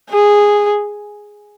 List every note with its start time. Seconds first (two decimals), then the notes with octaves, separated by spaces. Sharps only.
0.10 G#4